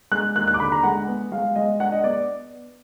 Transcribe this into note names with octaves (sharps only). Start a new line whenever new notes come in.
G#3 F#6
D#2 F#6
F#6
D6
D3 B5
A#5
G#3 F#5
B3
G#3 F5
G#3 D#5
D4 F#5
D#5
B3 D5